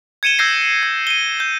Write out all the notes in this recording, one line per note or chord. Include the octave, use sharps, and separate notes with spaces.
G#6 C#7 D#7 E7 G7
E6 G6 G#6 A#6 C7
G#6
D#7 G7
G6